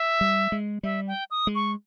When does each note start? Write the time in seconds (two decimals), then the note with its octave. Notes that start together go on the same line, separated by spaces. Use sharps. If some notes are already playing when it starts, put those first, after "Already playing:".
Already playing: E5
0.21 G3
0.52 G#3
0.83 G3 E5
1.07 G5
1.31 D#6
1.47 G#3
1.55 C#6